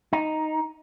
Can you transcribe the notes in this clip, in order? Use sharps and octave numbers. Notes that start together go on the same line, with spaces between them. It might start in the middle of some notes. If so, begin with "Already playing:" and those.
D#4